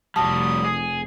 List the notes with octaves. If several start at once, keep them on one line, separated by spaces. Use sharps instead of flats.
F1 G3 F#4 A5 D#6
G#4